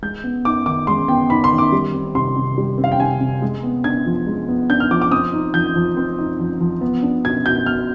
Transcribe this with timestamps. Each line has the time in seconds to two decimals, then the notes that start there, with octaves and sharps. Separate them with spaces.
0.02 G#3 G6
0.24 B3
0.45 D#4 D6
0.66 D#3 D6
0.87 G#3 C6
1.08 B3 G5
1.30 D#4 B5
1.44 C6
1.51 D#3
1.58 D6
1.72 G3
1.94 C4
2.15 C3 C6
2.36 C3
2.58 G3
2.78 C4
2.84 F5
2.92 G5
3.00 C3 G#5
3.20 C3
3.42 G#3
3.63 B3
3.84 D4 G#6
4.06 F3
4.27 G#3
4.48 B3
4.70 D4 G6
4.80 F6
4.91 F3 D6
5.02 D6
5.12 C4 D#6
5.33 D#4
5.54 F3 G6
5.76 F3
5.97 C4
6.19 D#4
6.39 F3
6.61 F3
6.81 B3
7.03 D4
7.24 B2 G#6
7.46 B2 G6
7.66 B3 F6